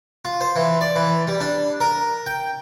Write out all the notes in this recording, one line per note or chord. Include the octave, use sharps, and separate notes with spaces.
F4
C5
E3
D5
E3
G3
D4
A#4
G5